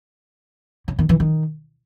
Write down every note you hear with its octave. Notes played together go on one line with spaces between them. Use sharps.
C#3
D#3
E3
D#3